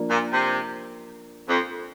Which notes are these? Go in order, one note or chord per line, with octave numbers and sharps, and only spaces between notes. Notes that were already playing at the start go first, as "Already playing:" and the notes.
Already playing: F3 A#3 D4
A#2
C3
F2